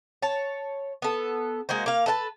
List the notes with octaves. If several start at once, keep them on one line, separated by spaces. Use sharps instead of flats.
C#5 A5
B3 A4
G#3 A#3 F#4 C5
A#3 F5
A4 B4 F5 A5